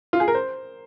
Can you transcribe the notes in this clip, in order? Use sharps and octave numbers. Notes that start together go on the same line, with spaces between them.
F4
G#4
A#4
C5